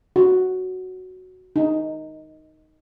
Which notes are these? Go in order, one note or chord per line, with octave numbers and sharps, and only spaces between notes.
F#4
D#4